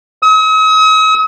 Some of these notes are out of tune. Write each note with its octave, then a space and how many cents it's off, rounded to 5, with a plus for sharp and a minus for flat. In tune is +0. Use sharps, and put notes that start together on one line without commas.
D#6 +45